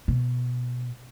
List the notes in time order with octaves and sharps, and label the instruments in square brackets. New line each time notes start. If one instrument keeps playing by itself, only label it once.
[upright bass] B2